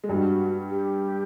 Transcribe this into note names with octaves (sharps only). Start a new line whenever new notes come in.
G#3
G2 G3 F#4
G4